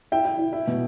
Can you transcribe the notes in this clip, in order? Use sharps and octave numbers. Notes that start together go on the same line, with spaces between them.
E4 E5 G5
E4
E4
E4
B2